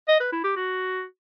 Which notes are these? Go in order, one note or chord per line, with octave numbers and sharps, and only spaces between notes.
D#5
B4
E4
G4
F#4